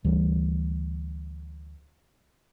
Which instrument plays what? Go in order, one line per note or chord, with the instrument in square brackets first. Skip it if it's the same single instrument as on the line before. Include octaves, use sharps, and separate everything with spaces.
[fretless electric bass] D2 E3 G3